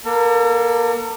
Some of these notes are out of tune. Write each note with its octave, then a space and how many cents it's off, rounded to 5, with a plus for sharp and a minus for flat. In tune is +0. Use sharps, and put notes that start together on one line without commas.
A#3 +20 A4 +45